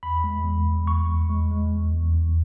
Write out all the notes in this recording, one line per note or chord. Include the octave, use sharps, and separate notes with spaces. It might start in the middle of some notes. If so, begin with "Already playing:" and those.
E2 B5
G#3
E2
E2
E2 C#6
E2
G#3
G#3
E2
E2
E2